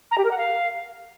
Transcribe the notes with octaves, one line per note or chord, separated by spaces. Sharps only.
A#5
G4
A#4
F#5
F5